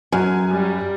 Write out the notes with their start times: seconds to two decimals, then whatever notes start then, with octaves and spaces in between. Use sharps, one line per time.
0.12 F#2 F#3 G#5
0.47 G3